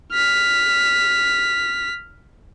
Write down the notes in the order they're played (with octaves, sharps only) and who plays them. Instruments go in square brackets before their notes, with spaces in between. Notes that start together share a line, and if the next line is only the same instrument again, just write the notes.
[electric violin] F6 B6